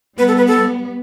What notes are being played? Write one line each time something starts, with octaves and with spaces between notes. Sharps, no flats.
G3 B3 B4
A4
B4
A4